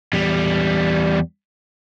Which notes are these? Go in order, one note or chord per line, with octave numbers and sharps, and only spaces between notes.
E2 G3